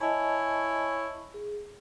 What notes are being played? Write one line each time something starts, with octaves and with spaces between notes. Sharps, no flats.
E4 C#5 D#5 G#5 A5
G#4